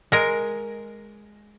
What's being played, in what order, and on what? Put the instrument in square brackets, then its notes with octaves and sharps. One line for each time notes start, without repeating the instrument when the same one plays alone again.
[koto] G#3 A#4